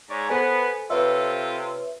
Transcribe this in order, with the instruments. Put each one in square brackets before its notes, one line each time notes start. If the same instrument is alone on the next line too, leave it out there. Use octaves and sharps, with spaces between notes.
[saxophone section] G#2 C#5 D5
[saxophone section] B3 [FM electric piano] A4 C5 G#5
[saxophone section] C3 F4 A4 [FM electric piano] B4 C#5 E5